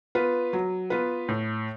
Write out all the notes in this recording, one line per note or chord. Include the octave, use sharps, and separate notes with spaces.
B3 F4 B4
F#3
B3 F4 B4
A2